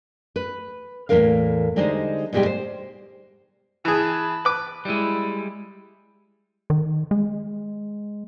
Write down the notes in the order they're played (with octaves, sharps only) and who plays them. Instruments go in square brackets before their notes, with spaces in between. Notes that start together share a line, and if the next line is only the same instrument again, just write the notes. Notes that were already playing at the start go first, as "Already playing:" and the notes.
[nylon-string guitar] B4
E2 A2 A3 A#3 A#4 F5
D3 G3 G#3 D#4 C5
G#2 B2 G3 G#3 D#4 G4
C5
[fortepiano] E3 G#4 [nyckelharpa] A5 B5
[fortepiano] B4 D6
[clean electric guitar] G3 G#3 [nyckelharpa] E4
[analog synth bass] D#3
G#3